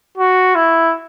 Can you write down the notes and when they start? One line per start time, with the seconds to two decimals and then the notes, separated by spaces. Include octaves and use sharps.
0.18 F#4
0.55 E4